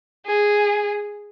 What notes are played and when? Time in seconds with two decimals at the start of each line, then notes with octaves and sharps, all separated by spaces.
0.26 G#4